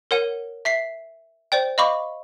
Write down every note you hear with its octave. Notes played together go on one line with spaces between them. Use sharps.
A#4 C#5 F#5 D#7
E5 B6 C7
C5 D5 G5
D#5 F5 B5 C#6 D6